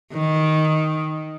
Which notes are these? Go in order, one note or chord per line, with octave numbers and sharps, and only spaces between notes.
D#3